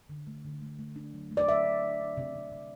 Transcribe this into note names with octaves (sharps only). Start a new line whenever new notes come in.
D3
A3
D3
A3
A3
D4
F#3
A3
D5
F#3 E5
D4
D4
D4
C3
C3
C3